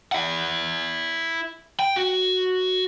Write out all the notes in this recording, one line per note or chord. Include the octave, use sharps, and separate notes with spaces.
E4 F#5
G5
F#4